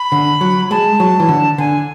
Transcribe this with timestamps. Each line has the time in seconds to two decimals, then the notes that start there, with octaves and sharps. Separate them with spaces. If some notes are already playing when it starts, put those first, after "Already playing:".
Already playing: B5
0.12 D3
0.41 F#3
0.71 G#3 A5
1.00 F#3
1.20 E3
1.29 D3
1.58 D3 G#5